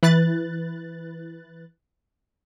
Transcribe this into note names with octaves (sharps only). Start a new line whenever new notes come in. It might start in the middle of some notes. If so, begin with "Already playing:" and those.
E3 B4 F#6 A6